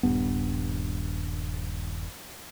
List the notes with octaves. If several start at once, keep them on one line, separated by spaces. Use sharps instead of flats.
D#1 G2 B3